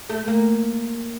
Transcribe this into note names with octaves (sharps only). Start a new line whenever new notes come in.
A3
A#3